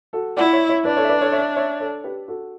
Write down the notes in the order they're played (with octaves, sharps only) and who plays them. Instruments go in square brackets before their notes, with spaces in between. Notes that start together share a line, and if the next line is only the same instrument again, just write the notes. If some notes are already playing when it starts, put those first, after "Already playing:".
[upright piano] F#4 A4
[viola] E4 [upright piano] D5 F#5
[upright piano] C#5 E5
C#5 E5
[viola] D4 [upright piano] B4 D5
[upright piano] A4 C#5
E5
B4 D5
A4 C#5
C#5 E5
C#5 E5
A4 C#5
G4 B4
F#4 A4